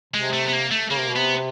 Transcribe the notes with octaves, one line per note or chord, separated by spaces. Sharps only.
C3 G#3
A3
B3
A#3
A3
C#3 A#3
C3
B2
C3 B3